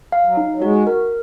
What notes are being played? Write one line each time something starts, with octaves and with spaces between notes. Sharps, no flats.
F5
F#3
D#4
F#3
G#3 F#4
A#4